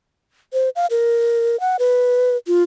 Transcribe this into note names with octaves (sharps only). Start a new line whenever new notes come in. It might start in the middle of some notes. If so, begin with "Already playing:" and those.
C5
F5
A#4
F#5
B4
F4